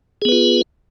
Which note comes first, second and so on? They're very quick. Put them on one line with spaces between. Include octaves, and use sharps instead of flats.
G#4 B3 B4 F4